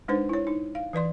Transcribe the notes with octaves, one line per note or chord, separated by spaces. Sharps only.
G#3 D4 D#4 B4 C5
E4 C#5
D#4
F5
E3 B4 D5 C6